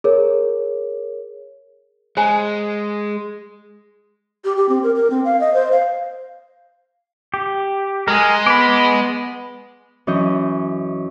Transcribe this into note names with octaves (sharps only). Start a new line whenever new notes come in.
G#4 A#4 C#5
G#3 C5 G#5 A#5
G4
G4
C4
A#4
A#4
C4
F5
D#5
C5
F5
G4
G#3 G#4 A#4
B3 B5 D6
F#2 E3 C#4 D#5 G6